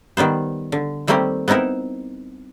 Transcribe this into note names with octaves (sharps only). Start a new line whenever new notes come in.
D#3 G3 B3 C5
D3
D#3 G3 A3 A#3 C4 G4
B3 C4 D#4 E4 A#4